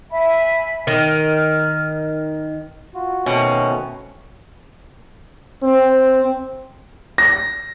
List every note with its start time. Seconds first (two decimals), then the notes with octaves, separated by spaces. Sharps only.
0.11 E5 G#5 B5
0.87 D#3 F6
2.95 F4 F#4
3.26 B2 D#3 A3 C4 C#4
5.63 C4
7.18 A#6